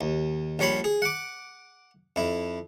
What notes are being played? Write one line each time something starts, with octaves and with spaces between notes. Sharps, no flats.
D#2
A#1 G3 C#5 B5 C6
G#4
F#5 D6
F2 E4